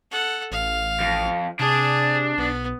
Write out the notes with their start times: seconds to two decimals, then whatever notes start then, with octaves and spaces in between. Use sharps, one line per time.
0.11 A4 F#5
0.51 A1 F5
1.01 F2
1.59 C3 D4 G#4
2.38 B1 B3